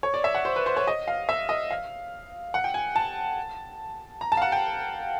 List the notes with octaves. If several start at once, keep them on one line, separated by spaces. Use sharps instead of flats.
C#5
D5
E5
F#5
C5
B4
C5
C#5
D#5
F5
E5
D#5
F5
F#5
G5
G#5
A5
A#5
A5
F5
F#5
G5